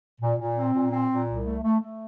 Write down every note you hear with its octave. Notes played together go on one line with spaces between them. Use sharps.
A#2
A#2
C4
A#2
C4
A#2
C2
A3
A3
A3